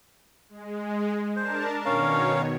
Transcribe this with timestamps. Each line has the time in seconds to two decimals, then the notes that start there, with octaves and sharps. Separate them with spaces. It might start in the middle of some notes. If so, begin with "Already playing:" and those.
0.49 G#3
1.36 D4 A#4 C5 A5
1.85 B2 D#3 C#4 A#4 C#5 F5